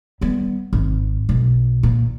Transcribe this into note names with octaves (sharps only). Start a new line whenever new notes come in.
G3 B3
G#1
B1
A#2